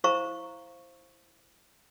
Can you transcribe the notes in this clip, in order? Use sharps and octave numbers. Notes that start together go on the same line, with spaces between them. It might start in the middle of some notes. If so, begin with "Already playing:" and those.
E4 C5 F5 A#5 C#6